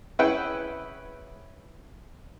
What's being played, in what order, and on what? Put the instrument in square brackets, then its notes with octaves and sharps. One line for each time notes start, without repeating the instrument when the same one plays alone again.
[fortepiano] C#4 E4 G#4 B4 F#5 G5